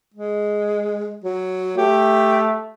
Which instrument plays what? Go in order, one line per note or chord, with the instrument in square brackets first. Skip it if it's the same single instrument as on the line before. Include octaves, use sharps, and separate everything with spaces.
[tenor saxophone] G#3
F#3
[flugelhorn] A3 [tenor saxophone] G4